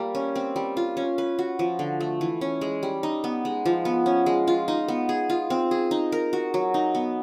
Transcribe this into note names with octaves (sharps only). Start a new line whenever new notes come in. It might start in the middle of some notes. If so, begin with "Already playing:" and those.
Already playing: G3 A#3
C#4
C4
G3
F4
C#4
B4
F#4
F3
D3
A3
E3
C#4
G#3
G3
D#4
B3
G#3
F3
B3
C#4
G#3
F4
D#4
B3
G#4
F4
C4
G#4
D#4
A#4
F#4
F#3
D#4
B3